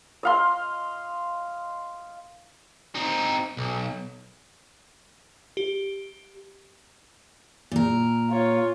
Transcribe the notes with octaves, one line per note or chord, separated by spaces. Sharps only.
D#5 F5 C6
C4 D#4
B1
G4
A#2 A#4
F4 C#5